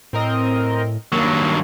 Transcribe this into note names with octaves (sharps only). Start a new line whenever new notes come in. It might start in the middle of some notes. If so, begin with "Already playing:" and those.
A2 C4 A#4 D#5
G2 D#3 F#3 A#3